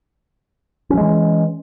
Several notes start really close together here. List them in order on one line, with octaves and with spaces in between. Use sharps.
C#4 F3 G#3 E3